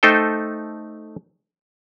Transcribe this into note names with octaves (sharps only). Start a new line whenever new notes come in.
A3 D#4 A4 C5 G5